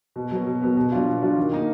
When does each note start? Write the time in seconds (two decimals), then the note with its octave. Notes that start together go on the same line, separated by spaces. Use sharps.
0.16 B2
0.31 F#3 B3
0.47 B2
0.61 F#3 B3
0.77 B2
0.92 F#3 D4 F4
1.07 B2
1.22 F#3 D4 F4
1.37 D#3
1.53 A#3 D#4